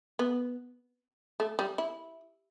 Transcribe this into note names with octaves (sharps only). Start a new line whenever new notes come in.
B3
A3
G3
E4